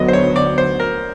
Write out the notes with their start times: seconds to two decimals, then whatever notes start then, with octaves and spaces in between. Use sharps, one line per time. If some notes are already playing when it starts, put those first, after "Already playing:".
Already playing: D2 D3 F#3 B3 D#5
0.08 C5
0.13 C#5
0.36 D5
0.58 C5
0.80 A#4